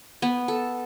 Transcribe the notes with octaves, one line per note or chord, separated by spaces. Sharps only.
B3
A4